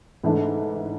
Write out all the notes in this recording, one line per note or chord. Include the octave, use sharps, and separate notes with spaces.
G#2 E3 A3 D4